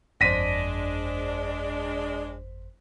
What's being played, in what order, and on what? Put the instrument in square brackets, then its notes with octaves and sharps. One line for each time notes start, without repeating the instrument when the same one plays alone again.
[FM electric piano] G1 F2 C5 [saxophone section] G#3 D4 [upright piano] A#6 B6 D#7